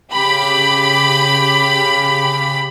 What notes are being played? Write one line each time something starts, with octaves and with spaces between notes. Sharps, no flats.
C#3 G4 B5